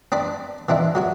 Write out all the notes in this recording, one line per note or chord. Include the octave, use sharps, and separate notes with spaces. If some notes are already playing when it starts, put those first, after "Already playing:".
C4 D4 D5 B5
E3 C4 D4 E4
F#3 F#4 C#5